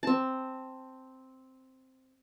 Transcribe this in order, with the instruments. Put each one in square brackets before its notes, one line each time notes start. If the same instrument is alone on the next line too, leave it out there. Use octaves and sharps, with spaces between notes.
[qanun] C4 A5